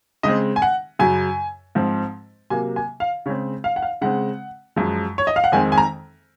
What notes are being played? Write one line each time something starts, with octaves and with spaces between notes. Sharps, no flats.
C#3 G#3 C4 D#5
G#5
F#5
F#2 C#3 F#3 G#5
G#2 F3 C4
C3 F#3 A#3 G#5
G#5
F5
C#3 G#3 C4 C#5
F5
F#5
F5
C#3 G#3 C4 F#5
F#2 F3 G#3
C#5
D#5
F5
F#5
F2 D#3 G#3 C4 G#5
G#5
A#5